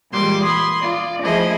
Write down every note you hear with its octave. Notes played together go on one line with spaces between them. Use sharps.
A#2 E3 G3 G#3 C6 D6
B5 C6 D#6 G#6
F4 D5
F3 A3 E4 G#4 C5 D#5